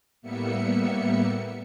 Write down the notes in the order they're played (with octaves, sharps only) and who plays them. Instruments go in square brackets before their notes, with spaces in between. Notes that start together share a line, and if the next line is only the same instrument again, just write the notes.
[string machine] A2 G3 A#3 B3 E5 C#7